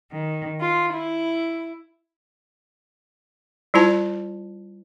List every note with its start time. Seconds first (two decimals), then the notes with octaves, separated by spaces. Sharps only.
0.13 D#3
0.58 F4
0.93 E4
3.74 G3 E4 F4 C5 A5